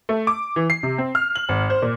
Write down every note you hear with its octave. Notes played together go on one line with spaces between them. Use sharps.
A3
D6
E3
C7
C3
C4
F6
F#7
G#1
C5
A#2